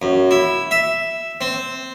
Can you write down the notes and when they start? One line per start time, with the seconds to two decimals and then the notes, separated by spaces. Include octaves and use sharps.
0.02 F#2
0.31 E4
0.71 E5
1.41 C4